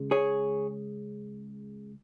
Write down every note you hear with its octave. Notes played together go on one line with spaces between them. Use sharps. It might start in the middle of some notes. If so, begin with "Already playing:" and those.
Already playing: C#2 C#3 G#3
G#4 C#5